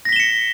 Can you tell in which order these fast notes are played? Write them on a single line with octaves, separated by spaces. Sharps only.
A#6 B6 G7 E7 C#7